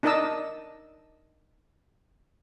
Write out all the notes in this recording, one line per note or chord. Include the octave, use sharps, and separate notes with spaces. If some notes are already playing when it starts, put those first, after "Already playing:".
D4 D#4 A#4 D#5 A5 E6